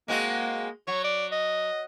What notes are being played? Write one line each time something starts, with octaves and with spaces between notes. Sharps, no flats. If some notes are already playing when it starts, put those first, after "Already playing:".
G#3 A#3 C4 F#4
F#3 C#5
D5
D#5